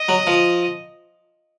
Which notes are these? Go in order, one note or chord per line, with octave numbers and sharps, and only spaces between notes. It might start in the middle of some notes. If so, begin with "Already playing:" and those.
Already playing: D#5
F#3
F3